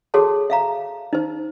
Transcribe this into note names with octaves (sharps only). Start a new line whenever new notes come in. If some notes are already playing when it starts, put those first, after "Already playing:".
F#4 G#4 A4 C#5 A5
E5 F5 A#5
D#4 C5